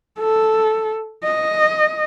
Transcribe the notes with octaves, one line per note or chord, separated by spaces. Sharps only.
A4
D#5